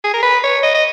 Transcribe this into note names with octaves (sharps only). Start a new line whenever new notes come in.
G#4
A#4
B4
C#5
D#5
D#5